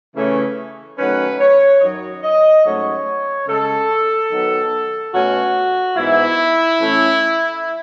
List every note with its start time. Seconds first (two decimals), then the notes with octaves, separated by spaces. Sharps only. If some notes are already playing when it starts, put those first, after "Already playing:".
0.16 C#3 E3 A3 C#4
0.98 D#3 F#3 A3 C#4 B4
1.40 C#5
1.81 F#2 D#3 F#3 D#5
2.23 D#5
2.65 G#2 F#3 A3 C#4 C#5
3.47 C#3 G#3 C#4 A4
4.31 D#3 F#3 B3
5.13 B2 A3 C#4 F#4
5.97 G#2 E3 B3 E4
6.80 A2 E3 A3 C#4